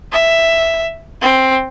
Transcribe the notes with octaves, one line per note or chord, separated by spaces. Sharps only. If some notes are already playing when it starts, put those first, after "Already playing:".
E5
C4